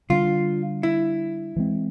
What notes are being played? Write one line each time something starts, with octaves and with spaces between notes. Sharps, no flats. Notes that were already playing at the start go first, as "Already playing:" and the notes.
D3 G3 B3 D4 F4
E4
E3 G#3 C4